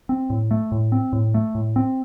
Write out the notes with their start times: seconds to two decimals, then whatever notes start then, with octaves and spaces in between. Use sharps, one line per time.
0.09 C4
0.30 A2
0.51 A3
0.72 A2
0.92 C4
1.13 A2
1.34 A3
1.55 A2
1.76 C4